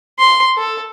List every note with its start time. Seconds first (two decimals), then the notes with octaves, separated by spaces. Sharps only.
0.19 C6
0.57 A4